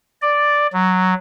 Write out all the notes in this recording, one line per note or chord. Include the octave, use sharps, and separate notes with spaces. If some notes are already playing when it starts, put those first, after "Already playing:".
D5
F#3